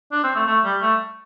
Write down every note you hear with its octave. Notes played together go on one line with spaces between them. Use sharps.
D4
C4
A3
A3
G3
A3